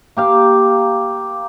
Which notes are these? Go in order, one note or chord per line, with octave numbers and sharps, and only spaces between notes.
A#3 G4 F5